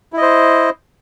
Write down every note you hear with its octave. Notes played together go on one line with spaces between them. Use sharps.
E4 C5 D#5